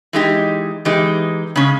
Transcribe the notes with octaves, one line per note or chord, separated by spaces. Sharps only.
E3 G#3 D#4 G4
E3 G#3 D#4 G4
C#3 G#3 C#4